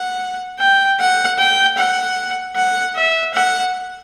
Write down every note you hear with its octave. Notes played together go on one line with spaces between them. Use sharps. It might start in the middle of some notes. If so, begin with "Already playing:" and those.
Already playing: F#5
G5
F#5
G5
F#5
F#5
E5
F#5